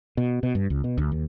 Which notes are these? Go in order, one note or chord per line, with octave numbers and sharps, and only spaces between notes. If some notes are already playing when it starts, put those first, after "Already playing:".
B2
B2
G2
C#2
B2
D2
D#2